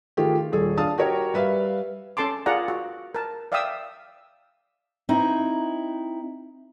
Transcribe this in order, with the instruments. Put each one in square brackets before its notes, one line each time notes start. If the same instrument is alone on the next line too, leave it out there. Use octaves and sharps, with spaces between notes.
[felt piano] D#3 A3 F4 G4 G#4
F4
D#1 G#4 A4
D4 F5 A5 D#6
F#4 G4 A#4 C#5
G3 B4 E5 F5
[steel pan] C#4 A4 A5 C6 D6
F4 G#4 A#4 D5 F#5 A#5
F#4
A#4 A5
D5 E5 F5 G5 D#6 E6
[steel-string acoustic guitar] C4 D#4 E4 E5